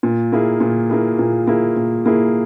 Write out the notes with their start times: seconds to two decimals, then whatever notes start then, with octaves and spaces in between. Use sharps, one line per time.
0.03 A#2
0.32 A#3 E4 G#4
0.60 A#2
0.90 A#3 E4 G#4
1.19 A#2
1.47 A#3 E4 G#4
1.77 A#2
2.06 A#3 E4 G#4